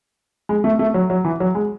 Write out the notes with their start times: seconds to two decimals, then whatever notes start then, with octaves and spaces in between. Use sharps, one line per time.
0.49 G#3
0.64 A3
0.79 A3
0.94 F#3
1.10 F#3
1.24 E3
1.40 F#3
1.55 G#3